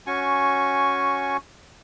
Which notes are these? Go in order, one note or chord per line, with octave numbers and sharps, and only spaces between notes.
C#4 F#4 G#5 C#6